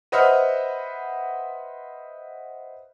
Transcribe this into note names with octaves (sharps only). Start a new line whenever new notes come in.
B4 C5 D#5 E5 F#5 F6